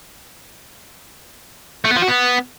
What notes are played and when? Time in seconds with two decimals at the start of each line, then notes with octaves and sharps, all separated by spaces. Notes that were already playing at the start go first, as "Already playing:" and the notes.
1.85 A3
1.90 B3
1.96 F3
2.02 F#4
2.08 B3